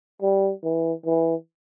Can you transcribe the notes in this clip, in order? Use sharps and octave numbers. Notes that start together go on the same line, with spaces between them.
G3
E3
E3